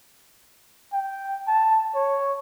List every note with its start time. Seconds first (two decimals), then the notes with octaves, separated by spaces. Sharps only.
0.93 G5
1.47 A5
1.95 C#5